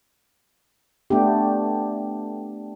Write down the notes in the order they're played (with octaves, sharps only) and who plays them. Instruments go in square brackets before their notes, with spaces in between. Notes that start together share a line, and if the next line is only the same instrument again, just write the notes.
[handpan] A3 B3 D4 G4